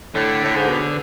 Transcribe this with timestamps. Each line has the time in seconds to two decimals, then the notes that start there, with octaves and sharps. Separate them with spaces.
0.14 A2 D3
0.44 A2
0.55 G#2
0.68 B2